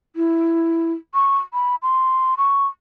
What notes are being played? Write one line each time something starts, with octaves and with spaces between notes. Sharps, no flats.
E4
C#6
B5
C6
C#6